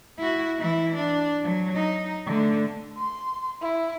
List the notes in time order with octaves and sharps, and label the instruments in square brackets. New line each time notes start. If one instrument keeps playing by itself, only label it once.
[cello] E4 F#4
E3 E4
D4
F#3
D#4
D3 A3
[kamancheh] C6
E4